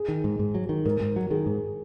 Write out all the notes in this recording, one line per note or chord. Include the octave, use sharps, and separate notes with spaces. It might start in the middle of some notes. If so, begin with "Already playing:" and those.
Already playing: G#4
D#3
G#2
G#2
F#3
D#3
G#2 A#4
G#2
F#3
D#3 G#4
G#2